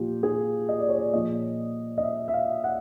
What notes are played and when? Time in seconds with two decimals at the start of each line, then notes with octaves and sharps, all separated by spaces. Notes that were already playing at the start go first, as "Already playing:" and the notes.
Already playing: A#2 F3 F4 G4
0.23 G#4
0.69 D#5
0.79 D5
0.89 C#5
0.98 D5
1.13 A#2 F3 D#5
1.98 D#5
2.03 E5
2.28 E5
2.34 F5
2.64 F#5